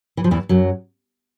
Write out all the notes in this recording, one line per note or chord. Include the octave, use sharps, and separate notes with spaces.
E3
F3
E2 E3
F#2 F#3